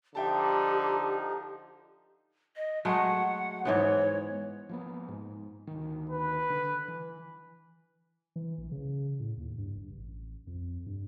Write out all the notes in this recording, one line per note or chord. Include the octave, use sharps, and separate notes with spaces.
D3 F3 D#4 G4 E5 G5 A5
D#5
F#3 G#3 A3 F#5
G#2 E3 B3 C#5
F3 A#3 B3
G#2
D2 D#3
B4
D3
E3
E3
A#1
C#3
A2
D#2
G2
F#1
A1
F2
G2